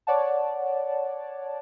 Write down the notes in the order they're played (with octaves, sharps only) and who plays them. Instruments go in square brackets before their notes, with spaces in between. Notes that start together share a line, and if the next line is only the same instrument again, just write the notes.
[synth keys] C#5 D5 F#5 A5